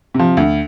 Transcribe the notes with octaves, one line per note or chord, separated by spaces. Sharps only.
C3
F3
D2